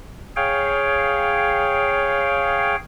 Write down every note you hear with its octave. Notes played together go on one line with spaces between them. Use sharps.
G#4 C#5 F5 G5